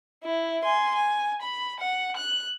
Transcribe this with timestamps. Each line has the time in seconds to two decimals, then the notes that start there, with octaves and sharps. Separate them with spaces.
0.24 E4
0.63 G#5 C6
0.95 G#5
1.42 B5
1.80 F#5
2.17 F#6